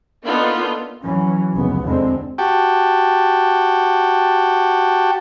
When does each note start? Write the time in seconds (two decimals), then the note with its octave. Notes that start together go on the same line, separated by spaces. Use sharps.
0.25 A#3 B3 D4 D#4 F4 A4
1.03 E3 F#3 C#4
1.53 F1 C#2 B3
1.84 F1 E2 D3 G#3 C4
2.38 F#4 G4 G5 A5